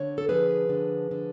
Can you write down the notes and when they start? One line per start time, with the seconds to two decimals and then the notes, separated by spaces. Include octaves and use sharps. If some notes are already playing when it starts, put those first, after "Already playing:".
Already playing: D3 C#5
0.18 A4
0.29 F3 G#4 B4
0.69 D3
1.11 D3